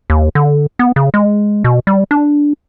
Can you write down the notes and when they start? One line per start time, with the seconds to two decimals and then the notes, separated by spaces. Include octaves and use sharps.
0.10 D#2
0.35 D3
0.79 B3
0.96 C#3
1.14 G#3
1.64 B2
1.87 G3
2.11 D4